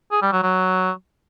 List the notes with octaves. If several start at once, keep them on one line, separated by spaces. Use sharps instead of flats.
G#4
G3
F#3
F#3